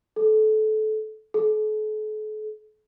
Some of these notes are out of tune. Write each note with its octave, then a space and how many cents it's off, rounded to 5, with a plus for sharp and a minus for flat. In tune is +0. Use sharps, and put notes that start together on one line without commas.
A4 -25
A4 -45